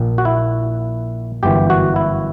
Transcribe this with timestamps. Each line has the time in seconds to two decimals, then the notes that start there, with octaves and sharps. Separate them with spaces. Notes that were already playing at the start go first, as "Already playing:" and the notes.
Already playing: A#1 A#2
0.18 F#4
0.25 E4
1.43 G1 F#2 E3 G4
1.70 F#4
1.96 E4